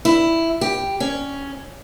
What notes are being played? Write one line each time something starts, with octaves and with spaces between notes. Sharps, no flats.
E4
G4
C#4